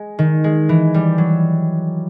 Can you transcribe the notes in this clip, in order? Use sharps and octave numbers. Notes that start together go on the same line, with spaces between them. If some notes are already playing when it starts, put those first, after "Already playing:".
Already playing: G#3
D#3
G#3
E3
G3
F#3